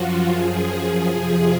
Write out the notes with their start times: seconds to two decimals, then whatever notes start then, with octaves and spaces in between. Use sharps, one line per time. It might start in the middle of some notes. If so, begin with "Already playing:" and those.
Already playing: F#2 F3 F4 F#4
0.32 F#2 F3 G#4
1.10 F2 C3 F3